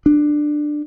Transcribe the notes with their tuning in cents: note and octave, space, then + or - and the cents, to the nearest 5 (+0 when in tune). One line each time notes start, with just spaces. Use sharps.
D4 +15